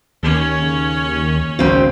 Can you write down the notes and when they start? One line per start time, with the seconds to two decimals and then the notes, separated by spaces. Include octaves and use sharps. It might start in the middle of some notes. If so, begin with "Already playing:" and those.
0.23 D#2 C#4 C#5
0.62 C#3
1.59 G#1 C#2 C#3 C4 F#4